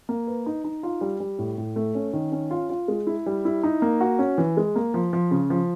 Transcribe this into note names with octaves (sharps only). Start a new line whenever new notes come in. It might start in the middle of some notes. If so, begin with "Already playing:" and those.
A#3
B4
D#4
D#4
F4
G3
G3
A2
A2
A3
C#4
D#3
C#4
F4
F4
G#3
E4
G3
E4
D#4
A#3
F#4
C#4
E3
G#3
A#3
F3
F3
C#3
F3